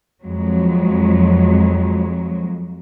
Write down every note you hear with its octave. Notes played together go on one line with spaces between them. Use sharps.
F2 F#3 G#3